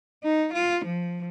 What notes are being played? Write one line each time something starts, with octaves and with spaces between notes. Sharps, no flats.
D#4
F4
F3